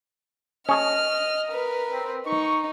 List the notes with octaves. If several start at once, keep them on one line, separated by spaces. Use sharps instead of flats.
C#4 G#4 D#5 A5 F6
A#4 B4
C4
D#4 C#6